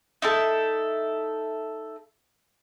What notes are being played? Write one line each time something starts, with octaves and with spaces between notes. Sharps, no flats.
D#4 E4 A4